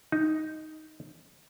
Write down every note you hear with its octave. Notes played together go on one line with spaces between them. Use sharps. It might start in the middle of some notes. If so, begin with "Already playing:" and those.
D#4